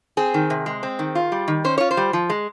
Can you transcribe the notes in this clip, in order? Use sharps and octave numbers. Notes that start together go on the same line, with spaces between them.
C4 G#4
D#3
C3
G#3
C4
D#3
F4
G3
D#3
C#4 C5
F4 C#5
C5
G3
F3
G#3